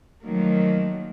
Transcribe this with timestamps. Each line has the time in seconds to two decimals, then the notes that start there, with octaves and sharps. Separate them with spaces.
0.23 D#3 F3 F#3 A3 A#3